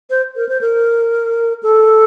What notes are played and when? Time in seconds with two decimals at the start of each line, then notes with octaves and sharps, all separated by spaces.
0.10 C5
0.36 A#4
0.49 C5
0.61 A#4
1.63 A4